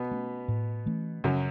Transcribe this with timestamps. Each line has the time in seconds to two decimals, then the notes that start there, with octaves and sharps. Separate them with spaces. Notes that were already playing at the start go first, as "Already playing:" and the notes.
Already playing: B2 B3
0.11 A3 C#4
0.48 A2
0.86 E3 A3 C#4
1.24 F#2 C#3 F#3